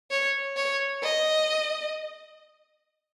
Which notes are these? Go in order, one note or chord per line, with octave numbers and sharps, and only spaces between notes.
C#5
C#5
D#5